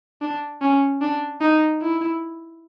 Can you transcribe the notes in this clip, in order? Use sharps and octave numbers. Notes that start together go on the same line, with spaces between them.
D4
C#4
D4
D#4
E4